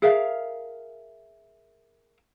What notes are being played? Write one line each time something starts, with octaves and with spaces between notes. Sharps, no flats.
G#4 A#4 E5 F5